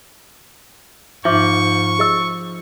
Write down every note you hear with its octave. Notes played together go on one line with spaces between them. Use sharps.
G#2 F3 E5 C#6 D6
G#4 D#5 E6